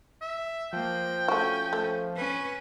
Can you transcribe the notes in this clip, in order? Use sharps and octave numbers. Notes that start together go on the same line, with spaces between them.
E5
F3 A#3 G5
A3 C#4 F#4
A3
C#4 B4